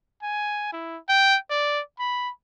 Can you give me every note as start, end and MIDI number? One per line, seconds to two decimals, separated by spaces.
0.22 0.70 80
0.73 0.97 64
1.09 1.37 79
1.50 1.80 74
1.99 2.30 83